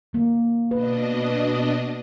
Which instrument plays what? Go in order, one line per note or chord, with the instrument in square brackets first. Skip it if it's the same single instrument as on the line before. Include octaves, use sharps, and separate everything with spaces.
[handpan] D3 A#3
[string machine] B2 D4 D#5 [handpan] B4